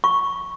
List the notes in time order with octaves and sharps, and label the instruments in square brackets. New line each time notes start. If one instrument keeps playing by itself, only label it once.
[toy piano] C#6